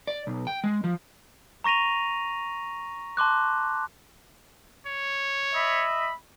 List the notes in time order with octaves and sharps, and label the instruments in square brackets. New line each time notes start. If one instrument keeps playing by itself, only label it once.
[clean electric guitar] D5
B1
G5
G#3
F3
[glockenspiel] A#5 C#6 A#6 D#7 F7
A5 C6 D6 F#6
[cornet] C#5
[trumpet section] D#5 E5 B5